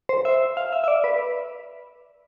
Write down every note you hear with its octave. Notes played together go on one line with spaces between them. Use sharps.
C5
E5
F5
E5
E5
D5
B4